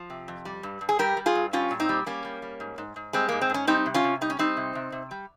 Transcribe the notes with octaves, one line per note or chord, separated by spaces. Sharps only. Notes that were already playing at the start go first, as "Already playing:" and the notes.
Already playing: F3
C3
F2
G3
G2
G2
G#4
G3 G4 A#4
G3
F4 G#4
G2
G3 C#4 F4
A#2
C4 D#4
G3
G3 A#3 C#4
G3
G3
G#2
G#2
G#2
G3 G#3 C4
G#2 A#3
C4
G#2 C#4
G3 C4 D#4
C3
C#4 F4
C3
G3 D#4
C#4
G3 C4 D#4
C3
C3
C3
G3